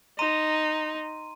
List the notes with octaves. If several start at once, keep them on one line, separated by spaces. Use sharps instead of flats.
D#4 A#5 C6 D#7